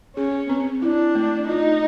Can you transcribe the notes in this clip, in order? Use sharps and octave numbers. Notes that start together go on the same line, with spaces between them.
C#4 G#4
C4
D4 E4
A3
D#4 F4